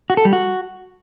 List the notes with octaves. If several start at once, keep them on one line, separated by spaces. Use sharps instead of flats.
F#4
A4
G3
F#4